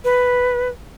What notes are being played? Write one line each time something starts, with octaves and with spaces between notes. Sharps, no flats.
B4